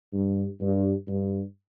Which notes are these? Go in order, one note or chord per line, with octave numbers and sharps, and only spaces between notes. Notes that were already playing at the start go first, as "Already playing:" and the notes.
G2
G2
G2